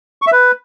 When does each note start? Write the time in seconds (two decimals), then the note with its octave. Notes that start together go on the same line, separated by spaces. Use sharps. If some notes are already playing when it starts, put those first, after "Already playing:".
0.22 C#6
0.27 E5
0.32 B4